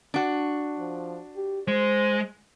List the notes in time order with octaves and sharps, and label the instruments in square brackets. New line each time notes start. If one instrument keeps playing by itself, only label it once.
[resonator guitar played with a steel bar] D4 F#4
[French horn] F3
G4
[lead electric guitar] G#3 [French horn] C5